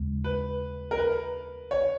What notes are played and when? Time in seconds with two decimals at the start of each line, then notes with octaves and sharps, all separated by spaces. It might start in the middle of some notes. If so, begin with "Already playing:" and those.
Already playing: D#2 C#3 G#3
0.24 B4
0.91 A#4
0.98 B4
1.71 C#5